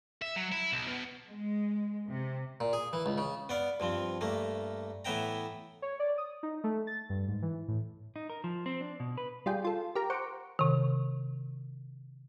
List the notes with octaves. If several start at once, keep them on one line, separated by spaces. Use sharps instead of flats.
E5
F#3
E4
B1
B2
G#3
C3
A#2
G#4
E3
C#2
C#3
B3 D5 F5
G2 F3 C4
G2 A3 A#3
A2 E3 B3 E5 G5 A#5
C#5
D5
D#6
D#4
A3
A6
G2
G#2
E3
A2
D#4
A#4
F3
C4
D4
B2
B4
G3 F4 G#4 G5
F4 A4
G4 A#4 A#5
C5 F#5 C#6 D6
C3 D#3